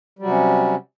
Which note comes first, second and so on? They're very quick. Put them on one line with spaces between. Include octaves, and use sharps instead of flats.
G3 F#3 C3 C#4